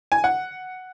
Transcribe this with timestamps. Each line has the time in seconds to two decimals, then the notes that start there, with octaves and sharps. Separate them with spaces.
0.12 G#5
0.24 F#5